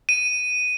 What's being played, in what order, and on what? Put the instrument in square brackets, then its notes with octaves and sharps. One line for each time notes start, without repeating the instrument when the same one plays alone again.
[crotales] D#7